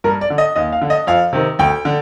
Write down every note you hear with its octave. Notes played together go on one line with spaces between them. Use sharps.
G2 A#4
D5
D3
D#5
D#2 D#5
F5
D3
D#5
F2 F5
C3 D#3
D2 G5
D3